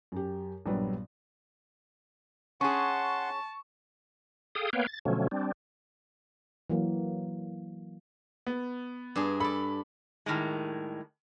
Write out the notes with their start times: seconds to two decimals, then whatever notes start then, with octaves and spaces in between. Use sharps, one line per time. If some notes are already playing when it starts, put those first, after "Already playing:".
0.12 F#2 G4
0.66 A#1 G2 F#3 G3 B3 B4
2.61 C#4 G#4 F#5 A5 C6 C#6
4.55 G#4 A4 F5 G5 D#6
4.73 A#3 B3 B4 C#5 F5 G5
4.87 A6
5.05 B2 D3 F3 F#3 A3 C#4
5.31 G3 C4 D4
6.70 E3 F#3 A#3
8.47 B3
9.16 G2 D4 G#4
9.40 A4 D5 B5
10.26 A2 D#3 G3 G#3